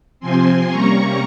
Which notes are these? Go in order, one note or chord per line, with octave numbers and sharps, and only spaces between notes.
C3 F3 C4 G#5 C6
C3 G3 A#3 C#4 A#5 C#6